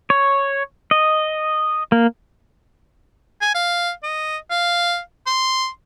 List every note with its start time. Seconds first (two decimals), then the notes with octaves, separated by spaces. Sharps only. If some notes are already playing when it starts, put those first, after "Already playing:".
0.10 C#5
0.91 D#5
1.92 A#3
3.41 G#5
3.55 F5
4.03 D#5
4.51 F5
5.27 C6